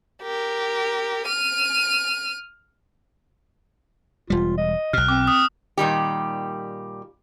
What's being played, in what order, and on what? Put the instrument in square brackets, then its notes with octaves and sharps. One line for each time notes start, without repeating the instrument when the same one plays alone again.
[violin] G4 A#4
F6 D#7
[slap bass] E1 G3 [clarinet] F4
[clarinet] D#5
[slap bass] B1 B2 [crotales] F6 F#6
[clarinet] C4 [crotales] D6
[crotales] D#6
[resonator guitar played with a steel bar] A#2 D#3 G3 G4